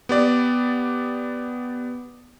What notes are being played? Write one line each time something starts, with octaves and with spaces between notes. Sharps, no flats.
B3 G4 D5